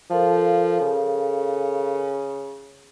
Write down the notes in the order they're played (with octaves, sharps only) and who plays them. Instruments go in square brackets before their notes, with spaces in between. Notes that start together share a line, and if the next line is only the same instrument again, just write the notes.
[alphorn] F3 [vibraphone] A4 A#4 F5
[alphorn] C#3